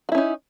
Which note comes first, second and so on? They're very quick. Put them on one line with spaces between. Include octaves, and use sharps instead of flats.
F#4 E4 C#4 D#4